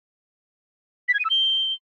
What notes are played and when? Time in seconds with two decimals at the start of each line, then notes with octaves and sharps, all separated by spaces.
1.08 B6
1.14 G#6
1.19 D#7
1.25 E6
1.30 G7